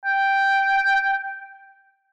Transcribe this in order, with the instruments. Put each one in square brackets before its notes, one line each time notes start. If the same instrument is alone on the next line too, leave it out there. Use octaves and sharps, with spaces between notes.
[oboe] G5